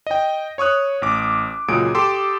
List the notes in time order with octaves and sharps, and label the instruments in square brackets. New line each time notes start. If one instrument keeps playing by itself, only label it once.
[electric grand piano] D#5 G5
C#5 C#6 D#6 F#6
A1 D6
C#2 A#2 F#3 G#3 D#6 D7
G4 A4 C6 D6 E6